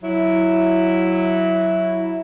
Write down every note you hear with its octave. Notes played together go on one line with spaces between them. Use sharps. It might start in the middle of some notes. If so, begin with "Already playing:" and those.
F#3 E4